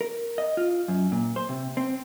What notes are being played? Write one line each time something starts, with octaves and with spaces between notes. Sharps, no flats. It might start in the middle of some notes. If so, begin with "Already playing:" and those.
A#4
D#5
F4
F#2
A#2
C5
C3
C4